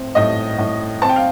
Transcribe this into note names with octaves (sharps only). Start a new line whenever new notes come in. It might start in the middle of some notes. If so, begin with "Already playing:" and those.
Already playing: A2 C4
A2 D#5
A2
C4 A5
G5
F5